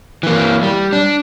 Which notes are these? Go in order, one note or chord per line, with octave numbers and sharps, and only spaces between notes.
E3 A#3
G3
D4